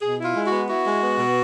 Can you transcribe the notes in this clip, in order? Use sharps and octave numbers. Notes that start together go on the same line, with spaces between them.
B2 G#4
E4
F4
G#3
F#4
B3
E4 F#4
G#3
B3
B2